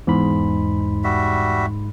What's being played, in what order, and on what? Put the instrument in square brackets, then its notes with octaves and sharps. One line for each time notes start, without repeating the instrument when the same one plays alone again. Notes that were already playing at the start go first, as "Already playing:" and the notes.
[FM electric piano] E2 [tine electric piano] G#2 B5 C6
[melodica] G3 F#4 E5